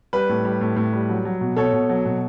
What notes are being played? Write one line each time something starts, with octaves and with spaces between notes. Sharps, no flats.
G3 B4
A2
G3
A2
A2
G3
F#3
F#3
B2
B2 A4 C#5
B2
F#3
B2